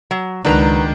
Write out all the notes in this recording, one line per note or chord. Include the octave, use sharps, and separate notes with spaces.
F#3
C#2 D#3 F#3 D4 B4 A#5